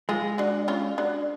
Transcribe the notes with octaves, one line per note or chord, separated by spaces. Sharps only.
G#3 F4 G#4
D4 F#4
C#4 F4
D4 F#4